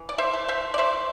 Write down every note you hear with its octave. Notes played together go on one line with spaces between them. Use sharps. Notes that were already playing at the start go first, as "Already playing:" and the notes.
Already playing: E3
D5
C5 E5
A3
C5 E5
D5
A3 C5 E5